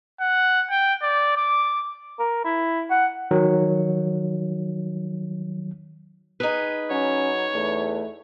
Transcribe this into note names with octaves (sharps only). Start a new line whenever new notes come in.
F#5
G5
D5
D6
A#4
E4
F#5
D#3 F#3
D#4 G#4 B4
F#3 C#4 C#5
E2 A3